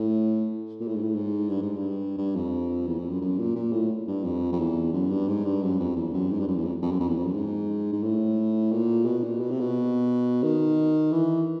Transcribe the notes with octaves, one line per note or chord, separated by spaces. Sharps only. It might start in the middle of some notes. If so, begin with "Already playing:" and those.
Already playing: A2
A#2
A2
G#2
A2
G#2
G2
G#2
G2
G2
F2
E2
F2
F#2
F#2
A#2
A#2
A2
G2
F2
F2
E2
F#2
G2
G#2
G2
F#2
F2
E2
F#2
G#2
G2
F#2
E2
F2
F2
F#2
F2
E2
F2
F#2
G#2
G#2
A2
A#2
B2
A#2
B2
C3
B2
D#3
E3